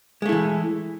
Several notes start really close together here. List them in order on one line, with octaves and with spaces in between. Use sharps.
G#3 A3 E4 E3